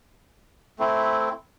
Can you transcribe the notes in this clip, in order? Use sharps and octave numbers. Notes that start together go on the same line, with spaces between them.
A3 C4 E4